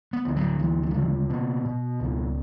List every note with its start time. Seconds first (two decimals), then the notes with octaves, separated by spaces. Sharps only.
0.13 B3
0.25 D2
0.36 F#3
0.59 D2 E3
0.83 E3
0.91 F#3
0.95 C#3 E3
1.29 B2 B3
1.65 B2
2.00 C#2